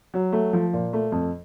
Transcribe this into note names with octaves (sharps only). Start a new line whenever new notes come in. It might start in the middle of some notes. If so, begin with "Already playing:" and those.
F#3
A3
F3
A#2
A3
F2